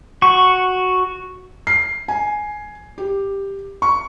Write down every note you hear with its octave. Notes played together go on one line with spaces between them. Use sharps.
F#4 C#6
C7
G#5
G4
C#6